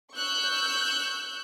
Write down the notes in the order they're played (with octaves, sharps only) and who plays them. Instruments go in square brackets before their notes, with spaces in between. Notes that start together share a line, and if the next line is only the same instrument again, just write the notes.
[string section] C#6 E6 F#6 G6